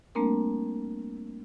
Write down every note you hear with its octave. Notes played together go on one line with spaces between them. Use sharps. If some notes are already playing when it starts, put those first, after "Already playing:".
G3 A3 A#3 C4 D4 A#4